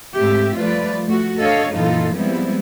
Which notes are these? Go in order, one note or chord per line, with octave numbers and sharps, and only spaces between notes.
G#2 A3 C4 G4 E5
F3 G3 A3 F4 B4 D5
A3 F#4
D4 A4 C#5 D#5 F5
F#2 A#2 E3 D#4 F4 A4
F3 G3 G#3 B3 C4 E4